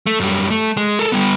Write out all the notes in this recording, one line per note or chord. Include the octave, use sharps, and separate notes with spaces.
A3
F#2 G3
A3
G#3
A4 A#4
G3 B3